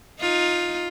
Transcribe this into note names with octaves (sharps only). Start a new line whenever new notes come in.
D#4 F4